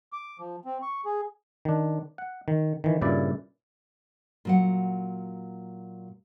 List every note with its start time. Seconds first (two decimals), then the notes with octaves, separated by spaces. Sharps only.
0.13 D6
0.39 F3
0.65 C4
0.82 C#6
1.05 G#4
1.65 D#3 D4
2.18 F#5
2.48 D#3
2.84 D#3 E3
3.01 G2 A#2 C#3 E4 D5
4.45 A#2 F#3 F#5